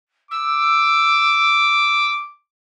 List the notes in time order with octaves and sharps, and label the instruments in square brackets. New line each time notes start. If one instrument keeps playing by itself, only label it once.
[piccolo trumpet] D6 [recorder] E6